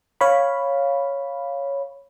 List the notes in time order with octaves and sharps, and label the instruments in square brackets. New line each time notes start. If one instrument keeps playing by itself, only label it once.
[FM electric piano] C#5 F5 B5